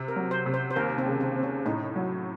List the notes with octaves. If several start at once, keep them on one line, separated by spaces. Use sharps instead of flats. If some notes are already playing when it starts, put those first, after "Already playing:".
Already playing: C3
A#4
F#3
C5
C3
C5
C5
D#2 A#4
C4
C#3
C4
C4
C#4
A2 D#4
F#3